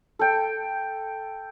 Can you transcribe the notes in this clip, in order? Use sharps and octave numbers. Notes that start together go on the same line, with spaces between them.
A4 G5